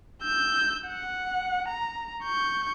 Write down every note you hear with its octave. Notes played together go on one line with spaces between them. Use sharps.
E6 G6
F#5
A#5
C#6 G6